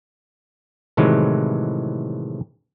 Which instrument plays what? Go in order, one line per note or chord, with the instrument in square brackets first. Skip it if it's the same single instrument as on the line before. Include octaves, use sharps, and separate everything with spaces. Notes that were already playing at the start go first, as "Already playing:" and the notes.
[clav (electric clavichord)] A2 C3 D#3 E3 F#3 G#3